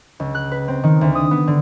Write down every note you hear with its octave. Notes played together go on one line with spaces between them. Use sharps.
C#2
F#6
B4
C4
D#3
D2
D#6
B3
D3